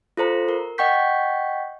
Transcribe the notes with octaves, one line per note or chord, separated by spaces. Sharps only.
F4 A4 C5 A#5
A#4
D#5 F#5 G5 C#6 G6 B6